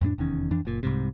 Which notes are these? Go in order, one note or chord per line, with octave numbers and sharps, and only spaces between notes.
F2 A2 B3 D4
F1 E2 D#3 C#4
F2 E3 D4
F#1 A#2
C2 G#2 C3